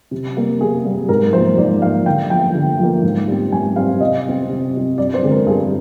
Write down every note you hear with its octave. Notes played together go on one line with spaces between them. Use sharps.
C3
G3 A#3
C3 G#4
G3 A#3
G#2 A#4
F3 A#3 C5
G#2 D5
F3 A#3 F5
D3 G5
F3 A#3 G5
D3
F3 A#3
G#2
G3 C4
G#2 G#5
G3 C4 F5
C3 D#5
G3 C4
C3
G3 C4
G2 D5
C5
D3 G#3 C4
A#4
G2 G#4